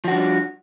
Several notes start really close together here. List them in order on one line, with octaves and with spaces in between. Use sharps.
F3 F#4 D4 G3